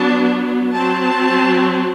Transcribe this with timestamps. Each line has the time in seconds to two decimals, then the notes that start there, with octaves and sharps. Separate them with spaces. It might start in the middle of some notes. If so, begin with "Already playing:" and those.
Already playing: F#3 B3 D4 A5
0.75 F#3 C4 A5